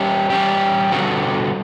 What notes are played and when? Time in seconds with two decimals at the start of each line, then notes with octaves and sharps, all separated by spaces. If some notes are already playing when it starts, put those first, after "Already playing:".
Already playing: G3 C#4 G4
0.30 G3 C#4 G4
0.92 D3 G3 B3 F#4 A4